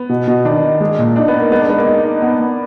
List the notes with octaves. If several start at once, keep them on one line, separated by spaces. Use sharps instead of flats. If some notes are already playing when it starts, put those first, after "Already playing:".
Already playing: B3
B2
B2
D#3 D4
D#3
G#3
A#2
D4 D#4
B3
D#4
A#3
G#3 B3
D4
G#3 B3
A#3
D#4
D#4
B3
B3